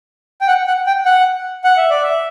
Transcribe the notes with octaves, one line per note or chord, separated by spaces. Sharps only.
G5
F#5
F#5
G5
F#5
F#5
E5
D5
E5